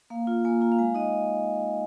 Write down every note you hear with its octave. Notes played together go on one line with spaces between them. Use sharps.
A#3 F5
F4
A#3 G#5
F4 A#5
F5
G#3 G#5
D#4 D#5